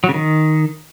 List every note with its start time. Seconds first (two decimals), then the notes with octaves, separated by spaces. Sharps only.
0.04 F#3
0.09 C#3
0.14 D#3